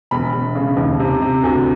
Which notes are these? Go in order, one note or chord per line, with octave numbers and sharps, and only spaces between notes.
E1 B5
E1
C#3
D#2
C3
C3
D2